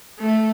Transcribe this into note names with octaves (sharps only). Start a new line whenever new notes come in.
A3